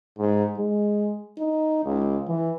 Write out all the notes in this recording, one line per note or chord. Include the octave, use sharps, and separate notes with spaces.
G#2
G#3
D#4
C#2
E3